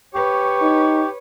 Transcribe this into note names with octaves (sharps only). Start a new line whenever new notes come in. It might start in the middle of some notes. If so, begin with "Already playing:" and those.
G4 B4 C#5 C#6
D#4